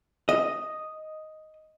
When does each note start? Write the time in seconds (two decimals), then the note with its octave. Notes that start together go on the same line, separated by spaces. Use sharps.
0.29 D#5